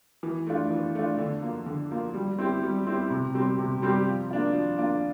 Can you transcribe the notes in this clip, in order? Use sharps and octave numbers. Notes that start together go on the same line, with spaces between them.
E3
A3 D4 F4
E3
A3 D4 F4
D3
F3 A#3
D3
F3 A#3
G3
C4 E4 G4
G3
C4 E4 G4
C3
G3 C4 G4
C3
G3 C4 G4
F3
A#3 D4 F4
F3
A#3 D4 F4